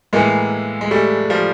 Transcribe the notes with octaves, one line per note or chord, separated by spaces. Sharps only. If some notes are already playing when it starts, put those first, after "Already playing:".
A2 E3 G#3 A#3
G#3
G3 A3
F3 G3